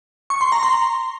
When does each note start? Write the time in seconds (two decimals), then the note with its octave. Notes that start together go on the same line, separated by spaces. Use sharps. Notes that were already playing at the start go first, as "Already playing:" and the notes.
0.30 C#6
0.41 C6
0.52 A#5
0.63 C6